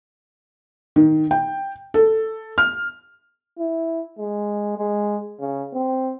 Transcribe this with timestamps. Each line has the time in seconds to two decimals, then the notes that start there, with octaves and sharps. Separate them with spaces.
0.96 D#3
1.31 G5
1.94 A4
2.58 F6
3.59 E4
4.19 G#3
4.78 G#3
5.40 C#3
5.73 C4